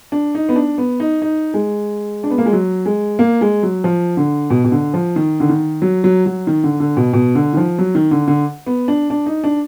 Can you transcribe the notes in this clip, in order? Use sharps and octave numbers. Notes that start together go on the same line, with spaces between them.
D4
D#4
B3
D4
B3
D#4
D#4
G#3
D4
B3
A#3
G#3
F#3
G#3
A#3
G#3
F#3
F3
D3
B2
B2
D3
F3
D#3
D3
D#3
F#3
F#3
F#3
D#3
D3
D3
B2
B2
D3
D#3
F3
F#3
D#3
D3
D3
B3
D4
D4
D#4
D4